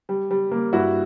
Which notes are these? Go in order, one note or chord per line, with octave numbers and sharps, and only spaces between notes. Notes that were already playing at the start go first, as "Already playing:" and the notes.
G3
G3
A#3
G2 E4 F#4